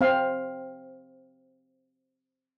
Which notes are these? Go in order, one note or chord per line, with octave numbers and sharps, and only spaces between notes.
C4 F5